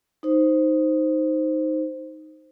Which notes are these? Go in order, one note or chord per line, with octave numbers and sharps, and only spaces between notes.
D#4 C5